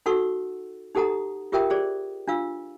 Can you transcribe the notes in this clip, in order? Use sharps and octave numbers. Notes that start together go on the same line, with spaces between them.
D#4 F#4 A4 F#5 C#6 E6
D#4 G4 A4 F#5 A#5 D#6
F4 G4 A#4 E5 G5 D#6
G4 G#4 C5 D5
D4 F4 F5 E6